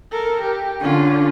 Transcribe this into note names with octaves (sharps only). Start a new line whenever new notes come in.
A4 A#4
G4
D3 C#4 F4